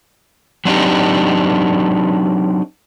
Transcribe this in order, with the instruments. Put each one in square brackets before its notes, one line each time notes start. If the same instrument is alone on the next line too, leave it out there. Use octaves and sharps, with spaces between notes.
[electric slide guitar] F#3 C4 D4 D#4 G4